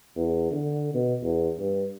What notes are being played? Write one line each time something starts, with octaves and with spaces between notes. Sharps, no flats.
E2
D3
B2
E2
G2